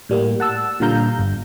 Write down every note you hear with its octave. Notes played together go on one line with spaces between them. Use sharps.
A2 G3 A#3
F#5 A5 E6
A#2 D3 G3 F5 A#5 G6
G1